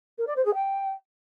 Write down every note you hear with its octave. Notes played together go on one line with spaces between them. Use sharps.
A#4
D5
C5
G#4
G5